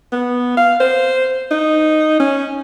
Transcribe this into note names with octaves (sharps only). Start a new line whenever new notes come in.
B3
F5
C5
D#4
C#4